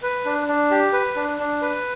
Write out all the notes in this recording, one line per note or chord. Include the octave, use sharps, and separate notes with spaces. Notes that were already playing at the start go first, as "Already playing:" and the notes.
B4
D4
D4
G4
B4
D4
D4
B4